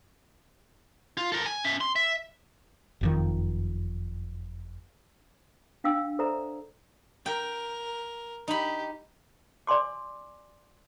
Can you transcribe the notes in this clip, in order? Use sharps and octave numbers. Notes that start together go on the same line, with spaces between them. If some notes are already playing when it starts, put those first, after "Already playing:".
F4
A4 A#4
G#5
C#4 E5
C6
E5
F#1 F2 D#3
D4 F5 G5 E6
A4 C5 D5 E5 A#5
A#4 G5
D#4 G4 B5
D5 G#5 C6 D6